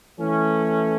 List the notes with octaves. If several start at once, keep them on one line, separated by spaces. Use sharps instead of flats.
E3 A3 C#4